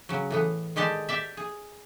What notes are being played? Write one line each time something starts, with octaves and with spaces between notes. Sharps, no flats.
C#3 F#3
A2 E3 B3
D#3 G#3 G4 D5 A5
G4 D5 E5
G#4